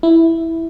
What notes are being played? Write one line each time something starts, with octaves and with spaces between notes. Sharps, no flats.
E4